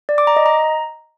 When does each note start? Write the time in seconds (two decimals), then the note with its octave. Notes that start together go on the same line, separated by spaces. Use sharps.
0.09 D5
0.18 D6
0.27 A#5
0.37 D#5
0.46 A#5